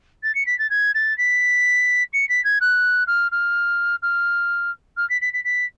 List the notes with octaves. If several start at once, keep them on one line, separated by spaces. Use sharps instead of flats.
A6
C#7
B6
A6
G#6
A6
B6
C#7
B6
G#6
F#6
F6
F6
F6
F6
B6
B6
B6
B6